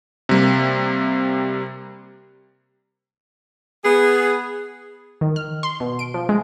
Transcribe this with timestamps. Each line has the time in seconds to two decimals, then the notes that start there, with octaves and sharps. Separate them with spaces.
0.29 C3 G3 A#3
3.84 B3 G#4
5.21 D#3
5.36 F6
5.63 C6
5.80 B2
5.99 D7
6.14 F3
6.29 G#3